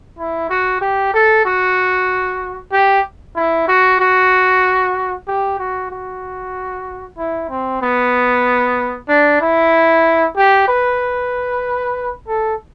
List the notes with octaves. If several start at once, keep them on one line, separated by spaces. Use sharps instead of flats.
E4
F#4
G4
A4
F#4
G4
E4
F#4
F#4
G4
F#4
F#4
E4
C4
B3
D4
E4
G4
B4
A4